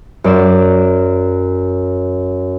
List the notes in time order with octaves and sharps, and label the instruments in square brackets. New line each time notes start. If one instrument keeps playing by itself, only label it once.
[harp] F#2 D5 E7